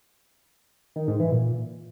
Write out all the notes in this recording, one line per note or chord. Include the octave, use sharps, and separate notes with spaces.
D#3
G#2
E3
A#2